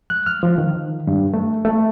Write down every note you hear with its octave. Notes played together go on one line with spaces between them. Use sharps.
F#6
F6
F3
D#3
G2
A3
A3